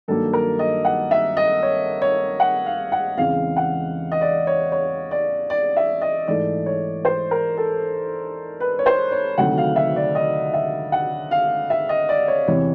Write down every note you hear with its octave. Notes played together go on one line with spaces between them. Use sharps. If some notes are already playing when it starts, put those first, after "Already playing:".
G2 D#3 F#3 A#3 A4
A#4
D#5
F#5
E5
D#5
C#5
C#5
F#5
F5
F#5
E2 C#3 E3 G#3 C4 F5
F#5
D#5
D5
C#5
C#5
D5
D5
E5
D#5
G#2 E3 A3 D5
C#5
C5
A#4
A4
B4
C#5
C5
C#5
D2 C3 D#3 F#3 A3 F#5
F5
E5
D5
D#5
E5
F#5
F5
E5
D#5
D5
C#5
E2 C3 E3 C#5